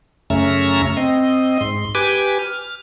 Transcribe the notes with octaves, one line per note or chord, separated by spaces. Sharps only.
F#2 C#3 A3 C#4 E5 A#5
C4 D#5
G#2 C6
G4 B4 G#5 D6
F6